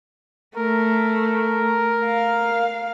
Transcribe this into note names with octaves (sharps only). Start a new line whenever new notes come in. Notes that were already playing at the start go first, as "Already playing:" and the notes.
A3 A#4
F5